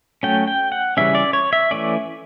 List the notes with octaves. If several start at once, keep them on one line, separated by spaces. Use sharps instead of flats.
F#3 A3 C#4 G5
G5
F#5
C#3 E3 G3 C#4 E5
D5
C#5
E5
E3 A3 C#4 D5